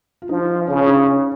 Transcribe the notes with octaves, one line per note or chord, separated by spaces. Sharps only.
F4
F3 D#4
C#3 C#4
C#4
D#4
C#4